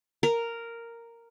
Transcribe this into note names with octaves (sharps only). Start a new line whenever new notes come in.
A#4